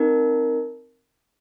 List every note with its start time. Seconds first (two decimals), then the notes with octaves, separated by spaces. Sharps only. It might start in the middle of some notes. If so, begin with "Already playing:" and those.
Already playing: C4 D#4 A#4